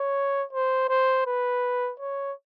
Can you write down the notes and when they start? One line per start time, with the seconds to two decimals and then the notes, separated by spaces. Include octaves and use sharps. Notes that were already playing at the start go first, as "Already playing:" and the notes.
Already playing: C#5
0.53 C5
0.89 C5
1.26 B4
2.00 C#5